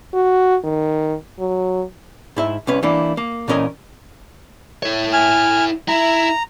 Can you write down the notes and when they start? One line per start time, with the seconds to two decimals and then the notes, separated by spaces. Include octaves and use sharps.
0.13 F#4
0.64 D#3
1.39 F#3
2.36 G#2 E4 E5
2.67 C2 C#4 B4
2.83 E3 A#3 D4 E4
3.17 A#3
3.48 A#2 E3 C#4 A#4 D#5
4.83 E4 C#5
5.13 G#5 F6
5.88 E4 A#5